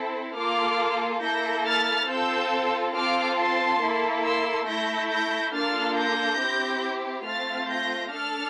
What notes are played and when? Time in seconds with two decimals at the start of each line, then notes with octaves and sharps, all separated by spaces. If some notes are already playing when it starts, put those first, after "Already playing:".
Already playing: C4 E4 A4
0.37 A#3 F4 A4 D6 F6
1.23 A#3 E4 A4 G6 A#6
1.66 F6 A6
2.10 C4 F4 A4 E6 G6
2.95 C4 F4 A4 D6 F6
3.38 A5 C6
3.81 A#3 E4 A4
4.24 C6 E6
4.67 A3 E4 A4 G6 A#6
5.10 G6 A#6
5.53 A#3 D4 F4 A4 F6 A6
5.96 G6 A#6
6.40 C4 E4 G4
7.26 A3 C4 F4 F6 A6
7.69 G6 A#6
8.12 D4 A4 F6 A6